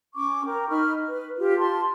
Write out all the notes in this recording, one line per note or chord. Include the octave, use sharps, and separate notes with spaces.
C#4 C#6 D6
A#4 G5
D#4 B5 C#6 F6
B4
F4 G4
A5 C6